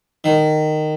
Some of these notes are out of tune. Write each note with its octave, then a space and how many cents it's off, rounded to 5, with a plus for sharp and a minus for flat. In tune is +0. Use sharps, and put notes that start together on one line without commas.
D#3 -15